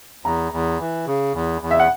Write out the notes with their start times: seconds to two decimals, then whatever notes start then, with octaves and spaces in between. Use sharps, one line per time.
0.25 E2 A#5
0.52 E2
0.80 E3
1.07 C#3
1.34 E2
1.61 E2
1.71 E5
1.80 F#5